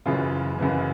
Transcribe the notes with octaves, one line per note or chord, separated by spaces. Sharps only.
F#1 F#2 C#3 E3 F4
F#1 F#2 C#3 E3